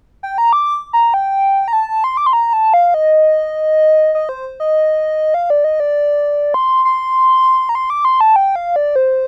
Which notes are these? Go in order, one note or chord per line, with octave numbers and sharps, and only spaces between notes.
G5
A#5
D6
A#5
G5
A#5
A5
C6
D6
C6
A#5
A5
F5
D#5
D#5
C5
D#5
F5
D5
D#5
D5
C6
C6
A#5
C6
D6
C6
A5
G5
F5
D5
C5